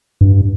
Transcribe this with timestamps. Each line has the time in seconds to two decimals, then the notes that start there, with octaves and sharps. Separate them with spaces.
0.21 G2